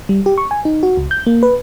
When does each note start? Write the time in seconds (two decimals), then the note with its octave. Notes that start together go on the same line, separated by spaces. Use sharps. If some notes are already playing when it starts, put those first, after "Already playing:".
0.09 G3
0.26 G4
0.38 C#6
0.51 G#5
0.65 D#4
0.83 F#4
0.97 C#2
1.11 G6
1.26 A#3
1.43 B4